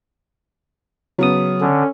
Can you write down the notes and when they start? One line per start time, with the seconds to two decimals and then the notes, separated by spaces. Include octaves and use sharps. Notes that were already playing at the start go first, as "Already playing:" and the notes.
1.19 C#3 F#3 B3 D#6
1.61 D3 C#4